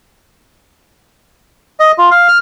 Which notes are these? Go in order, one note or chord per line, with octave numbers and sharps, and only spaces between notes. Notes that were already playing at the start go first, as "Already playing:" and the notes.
D#5
F4
F5
F6